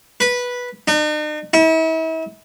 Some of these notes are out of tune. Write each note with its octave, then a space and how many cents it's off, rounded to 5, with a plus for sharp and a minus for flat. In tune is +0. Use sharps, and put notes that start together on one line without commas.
B4 -10
D#4 -45
E4 -40